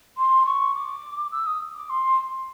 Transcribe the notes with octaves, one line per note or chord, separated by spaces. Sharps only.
C6
C#6
D6
E6
D#6
D6
C6